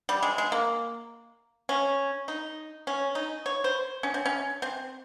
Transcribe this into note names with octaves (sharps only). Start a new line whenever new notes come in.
G3
G#3
G#3
A#3
C#4
D#4
C#4
D#4
C#5
C5
C#4
C4
C#4
C4